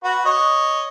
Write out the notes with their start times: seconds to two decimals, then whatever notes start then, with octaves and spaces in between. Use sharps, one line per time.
0.04 F#4 B4
0.25 C#5 D#5